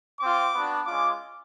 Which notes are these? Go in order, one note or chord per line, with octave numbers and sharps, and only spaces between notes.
C4 F4 D6
B3 D4 F#4
G#3 C#4 F4 D6